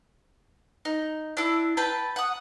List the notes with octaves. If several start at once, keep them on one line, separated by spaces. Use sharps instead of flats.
D#4
D4 E4
B4 G5 A5 B5
F#5 D#6